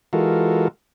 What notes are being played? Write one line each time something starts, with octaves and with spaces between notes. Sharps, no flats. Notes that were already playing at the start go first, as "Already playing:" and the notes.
E3 G#3 F4 F#4 A4 A#4